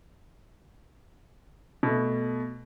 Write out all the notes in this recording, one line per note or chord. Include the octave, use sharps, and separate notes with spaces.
B2 A3